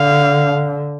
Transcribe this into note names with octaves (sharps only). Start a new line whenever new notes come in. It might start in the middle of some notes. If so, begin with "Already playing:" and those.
Already playing: D3 F5